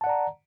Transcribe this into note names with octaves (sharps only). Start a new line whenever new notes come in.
D5 F#5 A5 A#5